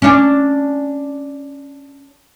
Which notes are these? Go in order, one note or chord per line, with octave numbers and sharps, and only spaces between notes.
C#4 D4